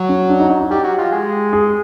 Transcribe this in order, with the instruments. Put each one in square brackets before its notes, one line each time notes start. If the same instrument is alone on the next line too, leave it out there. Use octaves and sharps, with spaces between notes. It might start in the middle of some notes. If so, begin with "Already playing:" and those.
Already playing: [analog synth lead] F#3
[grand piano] C#4
D4
D#4
D#4
D#4
[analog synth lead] G3 [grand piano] G4
[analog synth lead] F#3
F3
G#3
[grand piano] G#4